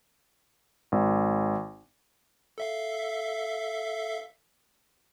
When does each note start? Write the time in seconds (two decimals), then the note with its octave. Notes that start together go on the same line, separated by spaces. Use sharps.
0.92 G#1
2.58 A4 E5 F5